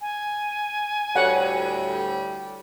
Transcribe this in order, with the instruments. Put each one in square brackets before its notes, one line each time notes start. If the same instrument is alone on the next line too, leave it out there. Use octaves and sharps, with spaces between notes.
[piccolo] G#5
[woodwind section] D2 A2 [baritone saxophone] G3 [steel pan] C#5 F#5